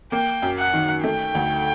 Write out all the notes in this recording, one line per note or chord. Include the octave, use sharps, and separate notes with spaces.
A#3 G5
F#2
F#5
D#3
A3 G5
D2